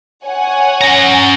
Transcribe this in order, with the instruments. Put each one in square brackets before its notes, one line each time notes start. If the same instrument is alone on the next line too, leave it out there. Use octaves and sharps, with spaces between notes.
[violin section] C#5 F#5 G#5
[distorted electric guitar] C#4 A#5